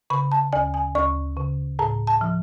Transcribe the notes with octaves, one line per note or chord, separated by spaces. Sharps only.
C#3 B5
A5
D2 G#5
G#5
D2 C#6
C#3
A2 A#5
A5
F3